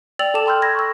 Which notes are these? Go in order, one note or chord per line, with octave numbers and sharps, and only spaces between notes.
D5 G5 E6 A6 F7 F#7
A4 A5 D6 E7
G5 B5 C6 E6 F6 G6
B5 G#6 A#6
C#6 E6